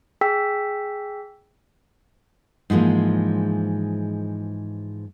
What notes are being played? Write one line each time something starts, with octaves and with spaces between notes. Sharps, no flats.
G#4 G5 E6 B6
G#2 E3 F3 G#3 A#3